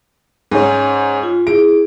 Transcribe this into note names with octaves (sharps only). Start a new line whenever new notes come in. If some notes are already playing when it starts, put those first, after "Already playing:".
G#2 C#4 G#5
F4
E4 G#4 D7